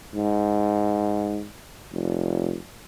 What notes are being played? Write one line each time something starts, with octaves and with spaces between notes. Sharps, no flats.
G#2
F1